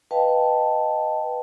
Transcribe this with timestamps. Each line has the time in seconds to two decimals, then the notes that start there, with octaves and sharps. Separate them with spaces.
0.11 B4 D#5 F5 G5 A5